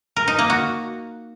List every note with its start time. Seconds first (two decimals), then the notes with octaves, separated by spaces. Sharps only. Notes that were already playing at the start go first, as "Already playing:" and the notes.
0.16 A#4
0.28 D#4
0.39 A#3
0.50 F#4